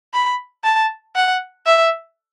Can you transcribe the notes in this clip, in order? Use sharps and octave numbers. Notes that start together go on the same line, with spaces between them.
B5
A5
F#5
E5